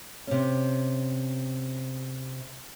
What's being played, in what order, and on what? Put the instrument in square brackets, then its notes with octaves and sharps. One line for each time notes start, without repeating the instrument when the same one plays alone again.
[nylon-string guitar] C3 C#4